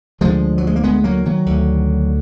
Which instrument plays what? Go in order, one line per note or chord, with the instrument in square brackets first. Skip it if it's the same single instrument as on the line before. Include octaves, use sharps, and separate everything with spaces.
[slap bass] D2 D3 F3 G#3
F#3
G#3
A#3
G#3 B3
F#3 A#3
D#3 F#3
D2 D3